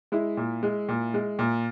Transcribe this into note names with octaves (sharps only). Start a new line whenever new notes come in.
G#3 E4
A#2
G#3
A#2
G#3
A#2